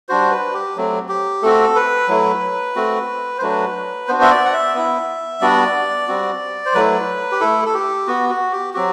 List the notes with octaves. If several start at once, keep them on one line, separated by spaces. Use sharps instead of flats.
G3 D4 F#4 C5
B4
G4
F#3 A3 C4
G4
A3 C4 F#4 A4
B4
F#3 A3 E4
A3 C4 F#4
C5
F#3 A3 D4 F#4 B4
B3 D4 F#4 C5
E5
D5
F#5
E5
B3 E4
G3 B3 D4 F#4 D5
G3 C4 F#4
C5
F#3 A3 E4 B4
G4
A3 E4 A4
A4
G4
B3 F#4
F#4
G4
F#3 C4 F#4 G4